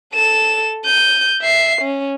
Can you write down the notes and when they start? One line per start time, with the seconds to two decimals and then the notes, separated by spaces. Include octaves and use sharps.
0.14 A4 E7
0.85 G6 D#7
1.42 E5 C7
1.82 C#4